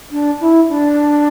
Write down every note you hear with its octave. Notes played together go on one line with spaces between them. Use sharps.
D4
E4
D4